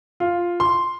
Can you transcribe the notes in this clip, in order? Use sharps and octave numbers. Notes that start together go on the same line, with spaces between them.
F4
C6